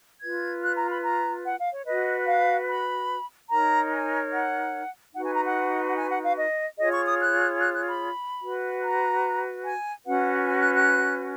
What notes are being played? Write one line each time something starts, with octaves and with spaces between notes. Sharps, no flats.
F4 B4 G#6
F#6
A#5
B5
A#5
F#5
F5
C#5
F#4 B4 D#5
F5
B5
D#4 A#4 C#5 A#5
G#5
F#5
D#4 F#4 B4 F#5
G#5
A#5
F#5
F#5
G#5
F#5
F5
D#5
F4 G#4 C#5 D#5
C#6
D#6
F#6
F#6
F#6
B5
F#4 B4
A#5
G#5
C#4 F#4 B4 F#5
G#5
F#6
F#6